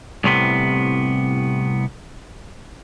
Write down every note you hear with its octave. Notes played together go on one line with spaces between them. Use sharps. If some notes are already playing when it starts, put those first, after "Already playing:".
C2 A2 C3 B3